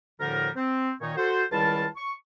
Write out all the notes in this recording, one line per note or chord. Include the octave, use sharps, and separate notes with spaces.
D2 A2 D3 F3 G3 A#4
C4
A#2 D#3 D#4 C#5
F#4 A4 C5
C#2 D#3 G3 E4 F4 A5
C#6